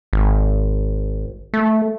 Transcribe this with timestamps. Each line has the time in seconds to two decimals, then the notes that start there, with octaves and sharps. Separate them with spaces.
0.13 G#1
1.54 A3